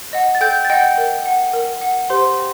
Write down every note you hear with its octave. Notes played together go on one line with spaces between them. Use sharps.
D#5 F#5
A6
A4 G5 G6
A6
D#5 F#5 G5 G6
A#4
F#5
A#4
F#5
G4 C5 C6
G5